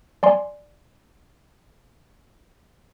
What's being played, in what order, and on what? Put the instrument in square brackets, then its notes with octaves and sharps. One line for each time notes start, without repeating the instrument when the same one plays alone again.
[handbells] D5 G#5 C6